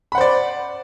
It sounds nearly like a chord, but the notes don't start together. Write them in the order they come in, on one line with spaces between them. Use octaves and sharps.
B5 F#5 C5 D5